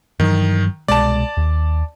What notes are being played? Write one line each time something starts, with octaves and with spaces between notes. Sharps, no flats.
G2 D#3 E3 F#3
C2 B2 G#3 D5 A5
D#2